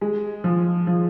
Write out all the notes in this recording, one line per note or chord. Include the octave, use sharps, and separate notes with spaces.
G#3
F3
F3